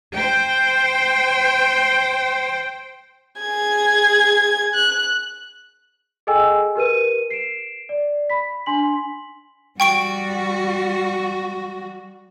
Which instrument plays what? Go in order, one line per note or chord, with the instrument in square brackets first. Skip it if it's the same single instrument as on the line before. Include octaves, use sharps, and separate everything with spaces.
[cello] C5 G5
[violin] G#4 G#6
F#6
[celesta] G#4 A4 D#5 G5 G#5 E6
G4 A#4 B4 D#7
C7 D7 E7
D5
B5 B6
D4 G#5 C6 B6 F#7
[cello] G3 F#4 [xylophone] G5 C#6 D7